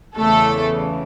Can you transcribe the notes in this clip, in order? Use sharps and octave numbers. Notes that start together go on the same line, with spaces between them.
E2 C#3 E3 A3 A4